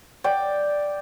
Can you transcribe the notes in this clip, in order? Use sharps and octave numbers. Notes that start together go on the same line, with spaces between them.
D5 G5